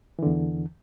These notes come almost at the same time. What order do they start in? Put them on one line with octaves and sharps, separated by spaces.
E3 D3 E2